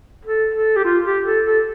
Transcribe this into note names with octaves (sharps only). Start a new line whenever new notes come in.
A4
A4
G4
F4
G4
A4
A4